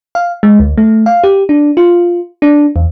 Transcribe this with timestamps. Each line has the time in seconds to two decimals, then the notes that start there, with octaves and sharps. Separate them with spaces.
0.15 F5
0.43 G#3
0.59 D2
0.78 A3
1.06 F5
1.24 G4
1.49 D4
1.77 F4
2.42 D4
2.76 E2